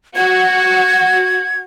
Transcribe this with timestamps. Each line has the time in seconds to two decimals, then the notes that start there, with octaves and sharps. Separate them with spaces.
0.16 F#4 G#6